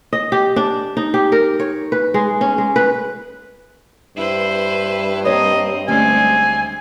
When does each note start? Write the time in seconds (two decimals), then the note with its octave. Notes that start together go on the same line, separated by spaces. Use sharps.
0.13 D#5
0.32 G4
0.56 D4
0.97 D#4
1.14 G4
1.32 A#4
1.60 C#5
1.92 B4
2.14 G#3
2.41 C#4
2.58 G#3
2.76 B4
4.17 G2 E4 B4 C5
5.25 A#3 C4 C#5 D#5 A#5
5.88 D2 G3 G#3 C4 C#4 G#5